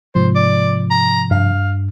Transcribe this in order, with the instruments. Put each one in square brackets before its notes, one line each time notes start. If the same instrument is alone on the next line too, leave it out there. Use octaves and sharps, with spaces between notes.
[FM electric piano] G#2 C3 F3 [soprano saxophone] C5
[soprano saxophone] D5
A#5
[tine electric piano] G2 [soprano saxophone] F5